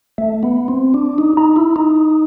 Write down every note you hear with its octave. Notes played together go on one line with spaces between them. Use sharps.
A3
B3
C4
D4
D#4
D#4
E4
D#4